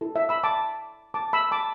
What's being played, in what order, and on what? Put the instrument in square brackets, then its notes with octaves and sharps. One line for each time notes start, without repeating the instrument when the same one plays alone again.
[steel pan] E4 A4
E5
B5 E6
A5 D6
A5 D6
B5 E6
A5 D6